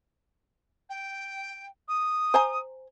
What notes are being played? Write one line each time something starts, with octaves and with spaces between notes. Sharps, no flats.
G5
D#6
C5 G#5 A#5